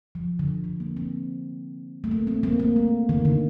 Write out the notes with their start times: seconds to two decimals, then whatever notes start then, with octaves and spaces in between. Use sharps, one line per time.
0.15 F3
0.39 D3
0.64 D3
0.80 A#3
0.97 C4
2.04 A3
2.11 A#3
2.27 C4
2.43 A#3
2.60 A#3
2.76 A3
3.09 D#3
3.25 D3